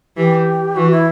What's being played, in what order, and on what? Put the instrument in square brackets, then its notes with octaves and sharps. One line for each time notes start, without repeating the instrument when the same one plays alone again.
[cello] E3 [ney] G4
[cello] E3 [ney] F#4
[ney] E4